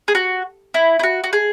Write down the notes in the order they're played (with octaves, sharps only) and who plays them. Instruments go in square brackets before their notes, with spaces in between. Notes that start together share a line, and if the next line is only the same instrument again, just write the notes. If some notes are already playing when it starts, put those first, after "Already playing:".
[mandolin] G#4
F#4
E4
E4
F#4
F#4
G#4